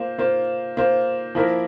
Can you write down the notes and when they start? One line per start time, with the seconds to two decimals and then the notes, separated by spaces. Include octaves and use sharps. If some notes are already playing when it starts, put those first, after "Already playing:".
Already playing: A#3 F4 C5
0.19 A#3 F4 C5
0.77 A#3 F4 C5
1.35 F3 A#3 E4 A#4